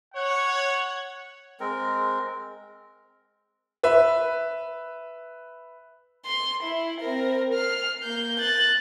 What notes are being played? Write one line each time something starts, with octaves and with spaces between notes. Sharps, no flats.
C#5 F#5
G#3 C4 A#4
B4 E5
C6
E4
C4 A#4
F6 C7
A#3 G6
F#6 A6